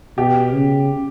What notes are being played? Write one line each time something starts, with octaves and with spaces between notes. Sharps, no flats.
B2 G4
C#3